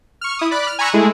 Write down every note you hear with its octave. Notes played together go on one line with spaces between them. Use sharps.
C#6 F6
E4 D#6
D5 B5 F#6
F6
G#5 A#5 B5 C#6 E6 F#6
G#3 A3 E4 G#4